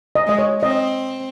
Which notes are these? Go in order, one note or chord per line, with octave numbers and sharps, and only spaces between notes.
D#5
G#3 D#5
C#5
C4 D#5